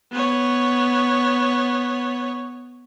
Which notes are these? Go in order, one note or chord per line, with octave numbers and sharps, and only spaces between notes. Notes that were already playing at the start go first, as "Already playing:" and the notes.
B3 C#5